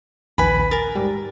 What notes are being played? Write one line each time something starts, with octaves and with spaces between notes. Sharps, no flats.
A#1 D#2 B4 G#5 B5
A#4 A6
G#2 G3